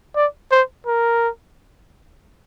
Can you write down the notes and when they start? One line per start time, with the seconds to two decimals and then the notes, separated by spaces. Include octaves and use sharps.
0.16 D5
0.51 C5
0.86 A#4